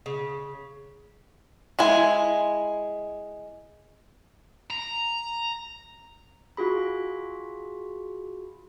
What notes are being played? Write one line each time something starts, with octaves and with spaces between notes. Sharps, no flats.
C#3
G#3 E4 G#5
A#5
F4 F#4 G#4 B5